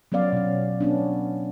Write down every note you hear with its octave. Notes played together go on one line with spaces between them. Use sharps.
F#3 B3 C#4 D5 F5
B2 C#4
B3 C#4 D4